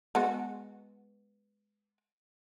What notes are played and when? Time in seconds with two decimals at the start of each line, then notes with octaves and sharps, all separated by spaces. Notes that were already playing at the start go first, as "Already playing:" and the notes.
0.15 G#3 B3 F#4